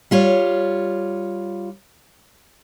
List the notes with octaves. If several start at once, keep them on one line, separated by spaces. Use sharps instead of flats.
G3 F4 C#5